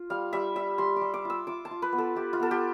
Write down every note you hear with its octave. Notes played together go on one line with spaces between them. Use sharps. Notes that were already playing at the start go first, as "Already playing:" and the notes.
Already playing: F4
G3 F5
G3 E5
G3 E5
G3 C6
D6
G3
D6
F4 E6
F4 D6
A5
F4
B4
B3
A4
F4 G4
F4
B3 A4
G4